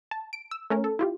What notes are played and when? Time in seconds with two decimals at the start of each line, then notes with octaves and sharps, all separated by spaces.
0.11 A5
0.33 D7
0.51 E6
0.70 A3 C#4 A#4
0.84 A4
0.99 E4 F4 G4